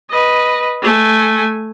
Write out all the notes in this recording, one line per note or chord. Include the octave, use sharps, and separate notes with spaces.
B4 D#5
A3 G#5